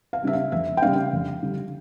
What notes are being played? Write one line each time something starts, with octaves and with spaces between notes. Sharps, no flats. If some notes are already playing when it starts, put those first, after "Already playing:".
F5
C#3 G3 A#3 D4 E5
F5
F2 E5
G5
C#3 G3 A#3 D4 F5
F2
D3 G3